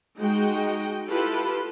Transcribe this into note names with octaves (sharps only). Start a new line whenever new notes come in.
G#3 D#4 F#4 G5
E4 F4 G4 A4 B4